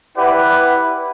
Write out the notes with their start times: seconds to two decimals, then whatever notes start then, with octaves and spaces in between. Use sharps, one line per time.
0.17 E4 G4 B4 D5 F#5